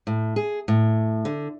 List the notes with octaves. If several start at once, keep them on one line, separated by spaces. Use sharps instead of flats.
A2
G#4
A2
D3